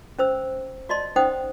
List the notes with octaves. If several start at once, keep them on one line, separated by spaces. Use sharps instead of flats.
C#4 C5 E6
F#4 D5 D#5 A5 C6
C#4 D#4 C5 F#5 G5 D#6